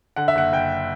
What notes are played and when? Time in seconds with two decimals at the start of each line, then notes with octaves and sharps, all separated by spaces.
0.16 D3 F#5
0.28 E5
0.35 F#1 F#5
0.52 F#1 G5